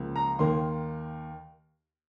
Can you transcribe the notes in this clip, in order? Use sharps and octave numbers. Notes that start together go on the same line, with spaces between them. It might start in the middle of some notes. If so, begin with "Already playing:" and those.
Already playing: C#2 C#3 F3 A#3
A#5
D#2 D#3 A#3 C6